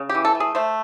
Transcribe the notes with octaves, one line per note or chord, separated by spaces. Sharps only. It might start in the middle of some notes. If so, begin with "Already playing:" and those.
Already playing: C#3
G4
E3
A4
A3
G#4
A3 C5